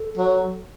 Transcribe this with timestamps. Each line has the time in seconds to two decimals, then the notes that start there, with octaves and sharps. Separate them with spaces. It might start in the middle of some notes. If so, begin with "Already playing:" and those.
Already playing: A4
0.17 F#3